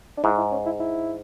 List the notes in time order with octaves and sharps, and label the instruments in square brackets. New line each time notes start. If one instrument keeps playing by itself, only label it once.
[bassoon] D4
[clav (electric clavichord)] G#2 [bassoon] E4
[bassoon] E4
C#4
E4
E4